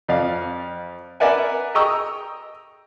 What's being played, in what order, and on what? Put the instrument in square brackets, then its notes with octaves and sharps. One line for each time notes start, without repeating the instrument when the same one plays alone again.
[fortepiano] F2 D5 F5
A#4 B4 D5 E5 F#5 G#5
D#5 G5 A#5 C#6 D#6 E6